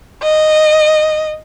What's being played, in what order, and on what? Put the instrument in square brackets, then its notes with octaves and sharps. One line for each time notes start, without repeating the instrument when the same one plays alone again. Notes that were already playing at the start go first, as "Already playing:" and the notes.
[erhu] D#5